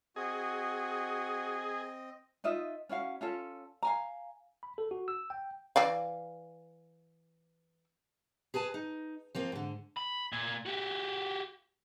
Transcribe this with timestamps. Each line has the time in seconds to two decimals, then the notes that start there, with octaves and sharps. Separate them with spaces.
0.16 C4 F#4 G#4 D#5
2.44 D#4 F4 D#5 E5
2.89 C#4 E4 F#4 F5
3.21 C#4 F4 A4
3.83 F5 G#5 A#5
4.63 B5
4.78 A4
4.91 F#4
5.08 E6
5.30 G5
5.76 E3 D5 F5
8.54 G#4 B4 G#5 A5
8.74 D#4
9.35 F3 A#3 C4
9.52 G#2 D3
9.97 B5
10.32 A#2
10.66 F#4 G4